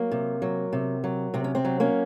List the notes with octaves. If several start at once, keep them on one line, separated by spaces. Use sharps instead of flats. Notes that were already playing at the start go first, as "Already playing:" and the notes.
Already playing: F#3 A#3
C3
F#3
C3
F#3
C3 C4
C#4
C4
F#3
A#3 C#4